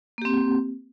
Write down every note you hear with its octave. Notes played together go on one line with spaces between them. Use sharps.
A#3 C4 G4